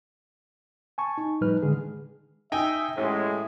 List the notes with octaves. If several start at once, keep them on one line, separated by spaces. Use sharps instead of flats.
G#5 A5 C#6
D#4
A2 F3 G3 D#4 B4 F6
D3 D#3 G#3 G#4
D#4 E5 G5 G#5
A1 A2 G#3